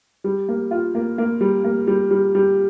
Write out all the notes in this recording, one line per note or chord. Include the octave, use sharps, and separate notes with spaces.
G3
A#3
F4
A#3
A#3
G3
A#3
G3
G3
G3